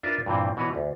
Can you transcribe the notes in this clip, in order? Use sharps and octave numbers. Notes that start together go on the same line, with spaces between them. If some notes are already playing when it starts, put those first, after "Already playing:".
D4 F4 A#4 B4 E5
G2 A#2 E3 C4
B2 E3 F#4 B4 C#5
D2